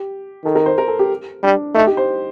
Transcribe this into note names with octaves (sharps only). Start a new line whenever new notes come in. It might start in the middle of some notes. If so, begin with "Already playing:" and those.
Already playing: G4
D#3 A4
A#4
C5
A#4
A4
G4
G3 D4
A3 D#4
G4
C5